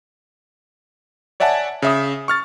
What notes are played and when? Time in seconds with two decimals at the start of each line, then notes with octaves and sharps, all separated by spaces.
1.40 C#5 D5 E5 F#5 G#5 A5
1.82 C#3 E5 D#6
2.28 C#6 F6 A6